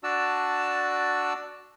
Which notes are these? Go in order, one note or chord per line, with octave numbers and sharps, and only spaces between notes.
D4 F#4 D5 A5 E6